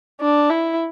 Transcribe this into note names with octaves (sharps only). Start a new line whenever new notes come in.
D4
E4